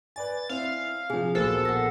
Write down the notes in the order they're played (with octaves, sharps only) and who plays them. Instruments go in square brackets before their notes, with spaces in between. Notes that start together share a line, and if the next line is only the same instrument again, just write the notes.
[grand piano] B4 D5 G#5 [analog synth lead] A6
[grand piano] C4 E4 [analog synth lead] F5
[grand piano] C3 F3 [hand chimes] G#4 G#5
[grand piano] A#1 B2 [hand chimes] F#4 A#4 C5 [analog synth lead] A4
[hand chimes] F#5 A#6